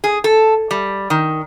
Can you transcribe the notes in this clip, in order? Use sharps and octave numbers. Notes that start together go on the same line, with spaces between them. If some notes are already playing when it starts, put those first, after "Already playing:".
G#4
A4
G3
D#3